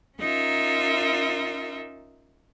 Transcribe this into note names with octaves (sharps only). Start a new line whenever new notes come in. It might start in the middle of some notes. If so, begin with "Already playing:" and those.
C#4 D#4 F4 A#4 E5